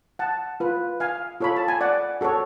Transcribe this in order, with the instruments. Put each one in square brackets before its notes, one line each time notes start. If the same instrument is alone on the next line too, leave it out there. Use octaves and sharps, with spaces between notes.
[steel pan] F#5 A5
F4 B4
F5 G#5
F4 A4 C#5 B5
A5
G#5
D5 F#5
F#4 A4 C#5